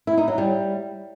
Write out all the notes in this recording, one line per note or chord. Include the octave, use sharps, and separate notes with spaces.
E4
D#4
F#3
G3